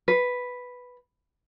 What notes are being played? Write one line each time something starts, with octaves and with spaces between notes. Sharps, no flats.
B4